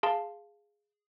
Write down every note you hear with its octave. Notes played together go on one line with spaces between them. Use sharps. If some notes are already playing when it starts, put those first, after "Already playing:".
G#4 F5 A5 C6